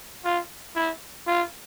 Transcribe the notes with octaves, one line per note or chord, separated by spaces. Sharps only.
F4
E4
F4